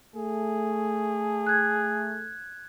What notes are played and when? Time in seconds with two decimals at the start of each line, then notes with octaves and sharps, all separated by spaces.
0.16 A3 G#4
1.47 F#6 G#6